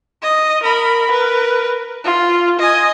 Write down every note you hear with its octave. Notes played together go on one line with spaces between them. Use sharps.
D#5
A#4 B5
A#4 B4
F4
D#5 G#5